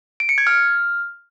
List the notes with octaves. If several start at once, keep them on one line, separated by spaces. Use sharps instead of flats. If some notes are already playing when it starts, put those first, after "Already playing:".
D7
C#7
G#6
F6